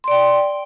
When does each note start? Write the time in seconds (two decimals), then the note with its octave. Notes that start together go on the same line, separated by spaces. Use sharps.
0.04 C6
0.08 D5
0.11 G5